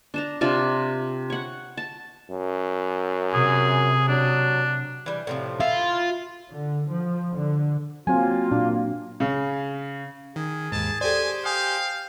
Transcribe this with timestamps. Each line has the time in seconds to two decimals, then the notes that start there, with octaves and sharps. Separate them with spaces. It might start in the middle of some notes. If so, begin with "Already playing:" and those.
0.14 D4 A5 A#5
0.41 C3 D4 F4
1.30 C#5 F#5
1.77 A5
2.30 F#2
3.34 C3 G#4
4.08 F#3 D4
5.06 E3 G3
5.27 A2 C3 F3
5.60 E4 F4
6.50 D3
6.86 F3
7.33 D3
8.07 F#3 A#3 C4 F4 G#5
8.51 A#2 D4
9.20 C#3
10.36 D#3 G#4
10.72 D#2 G#2 A5
11.01 G4 A4 C5 D5 G#5
11.45 F5 G5 G#5 D#6